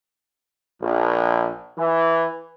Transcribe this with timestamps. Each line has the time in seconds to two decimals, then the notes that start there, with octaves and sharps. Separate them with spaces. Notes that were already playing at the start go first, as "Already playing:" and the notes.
0.81 A#1
1.78 E3